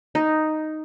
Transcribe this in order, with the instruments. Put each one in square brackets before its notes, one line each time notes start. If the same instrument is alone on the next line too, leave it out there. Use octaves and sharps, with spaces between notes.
[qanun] D#4